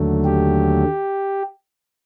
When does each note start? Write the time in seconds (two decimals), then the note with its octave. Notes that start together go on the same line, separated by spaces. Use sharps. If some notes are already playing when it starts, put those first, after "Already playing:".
Already playing: D#2 D3 F#3 A3
0.25 G4